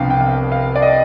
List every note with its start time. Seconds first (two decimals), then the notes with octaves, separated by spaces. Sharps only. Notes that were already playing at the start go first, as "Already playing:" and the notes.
Already playing: C2 C3 F3 B3 D4 F5 G5
0.10 G5
0.21 F5
0.52 F5
0.76 D5
0.82 D#5